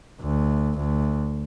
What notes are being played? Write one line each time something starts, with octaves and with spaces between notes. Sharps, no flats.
D2
D2